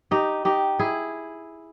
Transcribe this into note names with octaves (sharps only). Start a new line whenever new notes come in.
D#4 G4
D#4 G4
E4 G#4